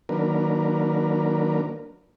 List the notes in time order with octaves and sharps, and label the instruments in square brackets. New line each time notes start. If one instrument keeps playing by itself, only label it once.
[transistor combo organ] D#3 F#3 A#3 D4 A#4 B4